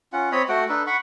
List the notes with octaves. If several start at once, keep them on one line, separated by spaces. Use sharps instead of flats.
C#4 F4 F#5
C4 C#5 D#5 B5
A3 F#4 F#5 G5
D4 D#4 A4 B4
F#5 B5 C#6